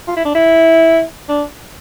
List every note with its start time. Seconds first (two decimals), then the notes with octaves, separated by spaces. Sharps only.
0.08 F4
0.16 E4
0.25 D4
0.35 E4
1.29 D4